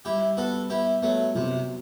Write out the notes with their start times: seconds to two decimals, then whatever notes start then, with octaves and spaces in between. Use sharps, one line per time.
0.05 G3 E4 G4
0.37 B3 F#4 A4
0.70 B3 E4 G4
1.02 F#3 A3 B3
1.35 C3 F#3